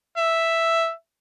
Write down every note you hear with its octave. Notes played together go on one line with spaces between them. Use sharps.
E5